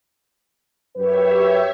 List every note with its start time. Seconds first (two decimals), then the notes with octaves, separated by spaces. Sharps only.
0.96 F#2 F#3 G4 B4 C#5 E5